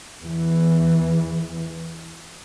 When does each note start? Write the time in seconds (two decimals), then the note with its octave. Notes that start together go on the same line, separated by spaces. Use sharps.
0.23 E2 E3